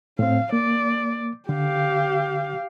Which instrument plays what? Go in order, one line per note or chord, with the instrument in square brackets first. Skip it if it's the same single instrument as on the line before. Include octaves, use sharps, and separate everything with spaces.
[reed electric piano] A2 C4 [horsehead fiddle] F5
[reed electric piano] A#3 [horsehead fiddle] D5
[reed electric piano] D3 [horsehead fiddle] G4 F5